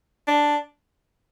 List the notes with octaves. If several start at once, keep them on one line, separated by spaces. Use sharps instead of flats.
D4